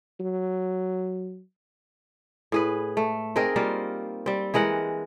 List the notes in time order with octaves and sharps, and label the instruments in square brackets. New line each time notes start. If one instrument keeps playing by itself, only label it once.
[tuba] F#3
[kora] A2 G#4 B4
A3
C4 D#4 G#4 A#4
G3 A#3 F4 C5
G3 C4
E3 G#3 A#4 F#5